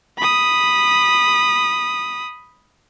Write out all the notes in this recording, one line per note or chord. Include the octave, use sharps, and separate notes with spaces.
B5 D#6